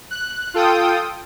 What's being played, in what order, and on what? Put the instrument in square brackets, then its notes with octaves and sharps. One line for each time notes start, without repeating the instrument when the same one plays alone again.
[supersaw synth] F#6
F4 A4 G5 D#6